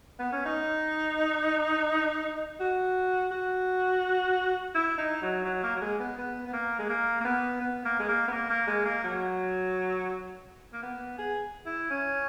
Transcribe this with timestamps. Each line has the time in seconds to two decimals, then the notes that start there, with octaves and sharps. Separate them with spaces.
0.19 B3
0.32 C#4
0.45 D#4
2.60 F#4
3.32 F#4
4.75 E4
4.98 D#4
5.22 F#3
5.46 F#3
5.63 A#3
5.76 F#3
5.82 G#3
5.99 B3
6.18 B3
6.47 B3
6.53 A#3
6.79 G#3
6.89 A#3
7.21 A#3
7.25 B3
7.61 B3
7.85 A#3
8.00 G#3
8.09 A#3
8.28 B3
8.32 A#3
8.50 A#3
8.68 G#3
8.86 A#3
9.04 F#3
10.73 A#3
10.83 B3
11.18 G#4
11.66 E4
11.91 C#4